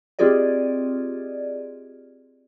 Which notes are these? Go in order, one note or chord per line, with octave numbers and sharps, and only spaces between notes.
C4 F4 G4 G#4 D5 D#5